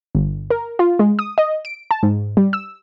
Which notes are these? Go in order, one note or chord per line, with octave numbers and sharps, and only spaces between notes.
G1
A#4
F4
G#3
D#6
D#5
D7
A5
G#2
G3
E6